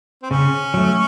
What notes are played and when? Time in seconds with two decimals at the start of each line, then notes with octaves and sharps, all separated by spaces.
0.23 C4
0.31 C#3 C#4
0.74 F#3 A3